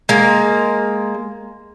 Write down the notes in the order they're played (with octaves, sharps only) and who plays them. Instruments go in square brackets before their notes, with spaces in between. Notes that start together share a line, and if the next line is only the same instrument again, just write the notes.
[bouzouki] G#3 A#3